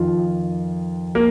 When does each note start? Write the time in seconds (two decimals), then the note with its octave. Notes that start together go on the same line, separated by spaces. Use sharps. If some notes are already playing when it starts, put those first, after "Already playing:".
Already playing: F2 D#3 F4
1.15 A#3